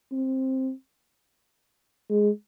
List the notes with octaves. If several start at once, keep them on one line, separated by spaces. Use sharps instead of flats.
C4
G#3